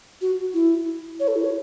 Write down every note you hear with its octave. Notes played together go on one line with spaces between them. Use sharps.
F#4
E4
C#5
A4
E4
C#5